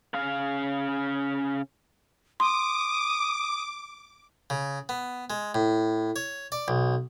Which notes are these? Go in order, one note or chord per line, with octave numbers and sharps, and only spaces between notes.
C#3 F5
C6 D6 D#6
C#3
B3
G#3
A2
C#5
D5
B1